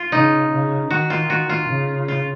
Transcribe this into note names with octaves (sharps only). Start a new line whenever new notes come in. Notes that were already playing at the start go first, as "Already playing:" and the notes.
Already playing: F4
C#3 D#4
C#3
D#3 F#4
F4
F#4
F4
C#3
F4